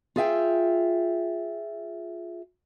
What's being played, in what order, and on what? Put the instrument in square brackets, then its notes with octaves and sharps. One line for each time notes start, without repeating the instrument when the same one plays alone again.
[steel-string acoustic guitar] F4 G#4 E5 G5